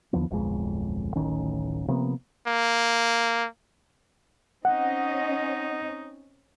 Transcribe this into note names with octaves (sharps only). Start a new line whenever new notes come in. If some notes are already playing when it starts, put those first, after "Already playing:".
D#2 D3 F3 B3
D1 B1 F2 G#3
D1 A1 D#3 C#4
C3 F3 A#3 B3
A#3
C4 C#4 D#4 D#5 F#5